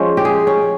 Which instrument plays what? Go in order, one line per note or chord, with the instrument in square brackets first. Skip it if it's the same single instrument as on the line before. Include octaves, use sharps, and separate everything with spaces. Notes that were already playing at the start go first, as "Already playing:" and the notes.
Already playing: [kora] F3 G#3 C#4 C5
G4
G#4
C#4